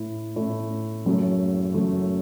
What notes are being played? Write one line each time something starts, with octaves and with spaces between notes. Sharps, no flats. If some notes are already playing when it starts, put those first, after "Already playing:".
Already playing: A2 A3 E4
A2 A3 E4
F#1 F#2 F#3 A3
F#1 F#2 F#3 A3